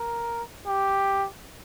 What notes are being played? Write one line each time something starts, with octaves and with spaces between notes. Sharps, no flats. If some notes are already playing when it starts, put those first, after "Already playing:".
Already playing: A#4
G4